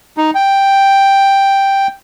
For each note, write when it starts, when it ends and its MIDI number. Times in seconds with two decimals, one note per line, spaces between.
0.17 0.31 63
0.35 1.87 79